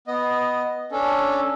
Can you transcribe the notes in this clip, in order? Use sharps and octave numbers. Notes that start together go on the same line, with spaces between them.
B3 D#5
C#4 D4 A4